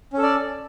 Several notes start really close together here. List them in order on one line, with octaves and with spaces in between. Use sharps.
C#4 A4 D5